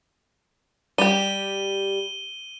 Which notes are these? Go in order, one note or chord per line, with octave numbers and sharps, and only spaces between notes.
G3 G4 D#7 G7